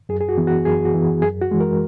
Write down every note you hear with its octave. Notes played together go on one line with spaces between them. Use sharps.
F#2 G#4
G#4
F#4
E3 B3
F#4
F#2 G#4
F#4
E3 B3
F#2 G#4
F#4
E3 G#3
A#4